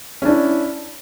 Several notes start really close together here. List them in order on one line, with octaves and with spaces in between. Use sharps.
C#4 D4 E4